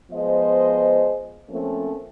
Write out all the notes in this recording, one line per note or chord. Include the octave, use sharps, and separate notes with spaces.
F3 G#3 B3 C5 D#5
F3 A3 A#3 C4 C#4